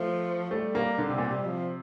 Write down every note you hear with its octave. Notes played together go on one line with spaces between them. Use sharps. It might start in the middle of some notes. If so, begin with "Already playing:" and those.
Already playing: F3 A3
G3 A3
A#3
D3
C3
A#2
C3
F3